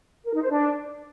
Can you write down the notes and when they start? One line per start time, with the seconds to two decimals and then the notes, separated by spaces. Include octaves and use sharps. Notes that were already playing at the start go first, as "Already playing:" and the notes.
0.25 A#4
0.33 D#4
0.42 C5
0.50 D4